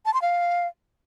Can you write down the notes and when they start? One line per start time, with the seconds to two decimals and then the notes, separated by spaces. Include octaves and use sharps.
0.06 A5
0.14 C6
0.22 F5